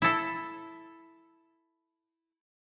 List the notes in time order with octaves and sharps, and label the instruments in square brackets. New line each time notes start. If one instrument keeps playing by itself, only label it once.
[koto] E4 A4